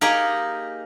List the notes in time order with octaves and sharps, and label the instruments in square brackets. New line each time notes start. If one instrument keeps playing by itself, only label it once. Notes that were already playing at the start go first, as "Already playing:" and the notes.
[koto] A#3 D#4 G4 G#4 A#4